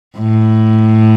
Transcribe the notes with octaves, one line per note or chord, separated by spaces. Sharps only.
A2